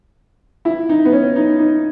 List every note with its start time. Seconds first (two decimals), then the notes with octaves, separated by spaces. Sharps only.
0.65 E4
0.89 D#4
1.05 B3
1.12 C#4
1.36 D#4
1.59 D#4